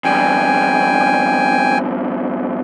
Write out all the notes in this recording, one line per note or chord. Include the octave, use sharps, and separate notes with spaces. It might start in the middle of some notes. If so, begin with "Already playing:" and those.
E2 G2 G5 G#5